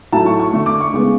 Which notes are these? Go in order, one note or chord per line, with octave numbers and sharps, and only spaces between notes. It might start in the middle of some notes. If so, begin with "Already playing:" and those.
A2 F#3 A3 A5
C#6
C#6
D3 A3 C#6
D6
C#6
C#3 G#3 B3